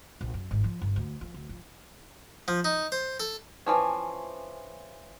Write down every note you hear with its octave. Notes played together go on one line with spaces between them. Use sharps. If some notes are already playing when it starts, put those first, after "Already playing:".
A#1
F#2
G#1
F3
G1
D2
F3
D2
F3
F3
D#4
C5
A4
E3 F3 C#4